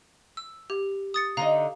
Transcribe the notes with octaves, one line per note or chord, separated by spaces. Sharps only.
E6
G4
D#6 A6 C#7
D3 D#4 D#5 F5 A#5